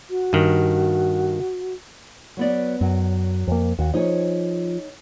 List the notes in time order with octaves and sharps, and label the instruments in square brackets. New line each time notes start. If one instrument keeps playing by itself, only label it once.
[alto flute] F#4
[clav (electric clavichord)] G2 D#3
[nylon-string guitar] F#3 B3 D5
[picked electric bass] F#2 [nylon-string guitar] F#3
[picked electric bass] F2 A#3
[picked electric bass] D#2 [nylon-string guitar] F#4
[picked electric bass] F3 [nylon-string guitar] D#4 G#4 C#5